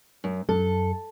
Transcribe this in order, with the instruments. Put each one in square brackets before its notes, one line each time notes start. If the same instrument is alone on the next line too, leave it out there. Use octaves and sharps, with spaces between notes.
[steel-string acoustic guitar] F#2
[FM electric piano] F#2 [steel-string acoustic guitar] A4